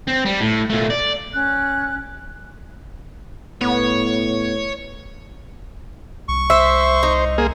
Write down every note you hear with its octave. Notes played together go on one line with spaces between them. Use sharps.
C4
G3
A2
A#2 A3
D5
C#4 F#6
A2 B3 C#5
C2 C#6
C5 E5
D#4
A#3 G#4